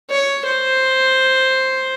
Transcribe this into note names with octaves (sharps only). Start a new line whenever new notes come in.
C#5
C5